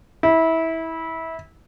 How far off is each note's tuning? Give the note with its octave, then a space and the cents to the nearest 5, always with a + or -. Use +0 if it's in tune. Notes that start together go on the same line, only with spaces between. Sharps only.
E4 -20